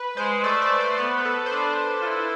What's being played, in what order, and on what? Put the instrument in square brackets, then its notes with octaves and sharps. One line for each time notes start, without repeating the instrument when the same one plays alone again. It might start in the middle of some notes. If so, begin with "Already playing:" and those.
Already playing: [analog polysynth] B4
[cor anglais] G#3 [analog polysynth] C5
[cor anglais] A3 [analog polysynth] D5
[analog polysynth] D5
C5
[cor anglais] A3
[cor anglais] B3 [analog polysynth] B4
[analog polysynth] B4
A4
C5
[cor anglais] D4 [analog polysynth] B4
[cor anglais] F4
E4